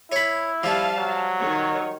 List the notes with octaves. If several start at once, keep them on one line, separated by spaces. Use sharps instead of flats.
E4 C#5 B5
F3 G3 F5 A5
F#3
D#3 C#5